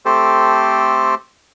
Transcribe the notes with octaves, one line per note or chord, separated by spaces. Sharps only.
A3 C4 G4 A4 C5